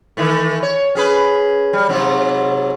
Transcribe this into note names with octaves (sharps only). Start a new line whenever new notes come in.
D#3 E3 A3
C#5
C#4 G#4 B4
G3
G#2 C3 F#3